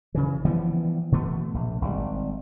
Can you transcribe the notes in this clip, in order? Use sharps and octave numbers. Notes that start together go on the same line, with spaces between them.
C#3 E3
E3 F3 G3 B3
B2 E3 A3 B3
A#1
G#1 G3